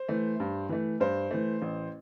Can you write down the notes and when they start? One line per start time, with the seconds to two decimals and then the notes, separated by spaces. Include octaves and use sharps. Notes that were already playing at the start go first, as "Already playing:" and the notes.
Already playing: C5
0.09 E3 A3
0.40 G2
0.69 E3 A3
1.00 G2 C5
1.31 E3 A3
1.62 A1